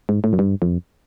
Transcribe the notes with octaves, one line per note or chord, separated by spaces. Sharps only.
G#2
A2
F#2
G2
F2